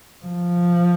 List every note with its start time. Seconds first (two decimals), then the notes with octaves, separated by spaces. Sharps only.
0.25 F3